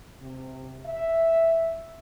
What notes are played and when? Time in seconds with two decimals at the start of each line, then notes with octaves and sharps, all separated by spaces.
0.20 C3
0.84 E5